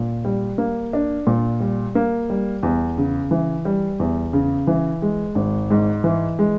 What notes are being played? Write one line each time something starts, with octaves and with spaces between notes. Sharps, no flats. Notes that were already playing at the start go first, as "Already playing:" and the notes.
Already playing: A#2
G3
A#3
D4
A#2
G3
A#3
G3
E2
C#3
E3
G3
E2
C#3
E3
G#3
G#1
G#2
E3
G#3